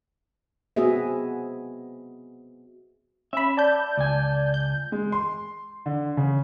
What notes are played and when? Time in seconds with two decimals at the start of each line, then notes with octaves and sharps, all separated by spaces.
0.76 B3 C4 F#4 G#4 D#5 E5
3.33 C#4 E5 B5
3.57 D5 A5 G6
3.97 C#2 G#5
4.54 G6
4.92 G#3
5.12 C6
5.86 D3
6.17 C#3